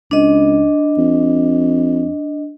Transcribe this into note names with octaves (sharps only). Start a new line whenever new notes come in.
C#2 D4 D#5
F2